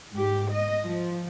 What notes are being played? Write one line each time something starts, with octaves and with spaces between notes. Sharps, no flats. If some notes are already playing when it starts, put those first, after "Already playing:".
G#2 G4
D#5
F3